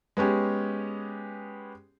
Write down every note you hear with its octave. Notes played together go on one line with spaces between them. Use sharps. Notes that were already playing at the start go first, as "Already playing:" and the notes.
G#3 B3 C#4 G4 G#4